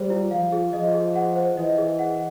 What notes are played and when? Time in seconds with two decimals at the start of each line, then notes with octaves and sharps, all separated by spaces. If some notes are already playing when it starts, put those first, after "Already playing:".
Already playing: G3 G#4 C5
0.10 F4
0.31 F3 F5
0.52 G#4
0.73 F3 D#5
0.94 G#4
1.15 F#5
1.36 C5
1.57 E3 D#5
1.78 G#4
1.99 F#5